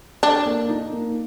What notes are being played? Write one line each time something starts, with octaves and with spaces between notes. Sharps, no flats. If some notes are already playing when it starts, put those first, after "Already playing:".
D4 A4
A#3
D#4
A#3